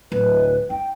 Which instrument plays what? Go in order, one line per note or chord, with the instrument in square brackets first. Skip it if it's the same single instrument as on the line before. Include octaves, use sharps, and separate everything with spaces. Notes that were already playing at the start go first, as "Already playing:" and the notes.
[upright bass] D1 [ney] B4
[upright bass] D#4 [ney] G5